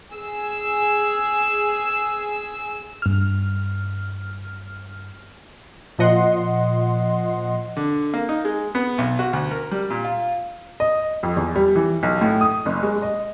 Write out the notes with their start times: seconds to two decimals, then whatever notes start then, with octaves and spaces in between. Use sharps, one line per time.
0.15 G#4 E6
3.02 G2 F6
5.99 A#2 F3 D#5 F#5 C6
7.77 D3
8.14 A#3
8.29 D#4
8.45 G#3
8.75 B3
8.98 B1
9.19 F#4
9.33 D2
9.51 A#4
9.72 G3
9.90 A#2
10.04 F4
10.80 D#5
11.23 F2
11.37 E2
11.56 G3
11.76 E3
12.03 B1
12.21 A2
12.41 D#6
12.66 F#1
12.83 G#3
13.02 D#5